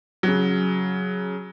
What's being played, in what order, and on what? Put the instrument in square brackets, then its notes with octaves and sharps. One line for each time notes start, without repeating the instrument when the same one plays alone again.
[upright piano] C#3 F#3